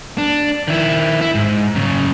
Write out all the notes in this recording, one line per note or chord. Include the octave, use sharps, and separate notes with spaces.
D4
D#3 E4
E4
G#2
F#2 C#3